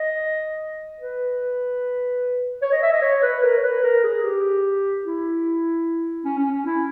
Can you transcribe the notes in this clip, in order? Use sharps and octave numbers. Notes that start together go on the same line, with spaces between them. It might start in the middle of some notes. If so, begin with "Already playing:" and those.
Already playing: D#5
B4
C#5
D#5
E5
D#5
C#5
B4
A#4
C#5
B4
A#4
G#4
G4
E4
C#4
C#4
C#4
E4